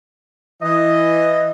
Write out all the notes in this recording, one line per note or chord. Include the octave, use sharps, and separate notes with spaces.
E3 D#5